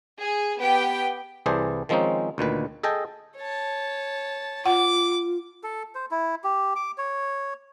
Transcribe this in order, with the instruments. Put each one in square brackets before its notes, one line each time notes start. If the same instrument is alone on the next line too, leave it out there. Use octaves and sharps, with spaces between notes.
[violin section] G#4
B3 G4 G5
[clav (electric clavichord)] C2 E3 G#4 C5 D5 A5
D#3 F3 G#3 C4 C#4 D#4
D2 A#2 D#3 B4
G#4 A4 D#5 G5 G#5
[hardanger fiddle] C#5 A5
[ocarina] F4 [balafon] F#5 [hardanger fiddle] D6
[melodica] A4
C5
E4
G4
D6
C#5